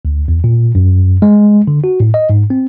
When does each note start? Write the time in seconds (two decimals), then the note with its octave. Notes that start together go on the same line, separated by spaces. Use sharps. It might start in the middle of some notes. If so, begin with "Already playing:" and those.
0.05 D2
0.28 E2
0.44 A#2
0.75 F#2
1.22 G#3
1.67 D3
1.84 F#4
2.00 A2
2.14 D#5
2.30 G#2
2.50 C4